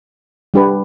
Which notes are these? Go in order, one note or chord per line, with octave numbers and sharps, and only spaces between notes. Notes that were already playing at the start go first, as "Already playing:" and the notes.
G3 D4 G4 B4